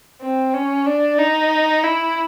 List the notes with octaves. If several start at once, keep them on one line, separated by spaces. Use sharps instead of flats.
C4
C#4
D4
D#4
E4